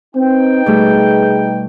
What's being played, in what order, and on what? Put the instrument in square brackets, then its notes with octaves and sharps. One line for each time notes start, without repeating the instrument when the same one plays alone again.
[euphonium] C4 [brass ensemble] D#4 B4 G5
[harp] B2 G3 A3 [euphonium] G#4